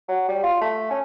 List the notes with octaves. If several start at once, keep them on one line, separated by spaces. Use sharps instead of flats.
F#3
G3
F4
A3
C#4